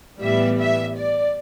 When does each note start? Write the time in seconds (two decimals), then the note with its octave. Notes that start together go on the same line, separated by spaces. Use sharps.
0.20 A2 E3 G3 B3 E5
0.58 E5
0.96 D5